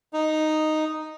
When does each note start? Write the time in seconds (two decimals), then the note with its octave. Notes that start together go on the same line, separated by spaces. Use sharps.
0.13 D#4